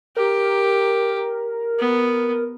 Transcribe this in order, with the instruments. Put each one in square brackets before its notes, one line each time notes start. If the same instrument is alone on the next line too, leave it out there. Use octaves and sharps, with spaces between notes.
[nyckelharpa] G4 [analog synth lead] A#4
[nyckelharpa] B3